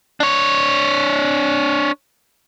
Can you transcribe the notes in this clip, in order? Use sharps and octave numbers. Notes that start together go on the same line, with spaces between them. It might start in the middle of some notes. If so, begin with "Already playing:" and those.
D4 C#5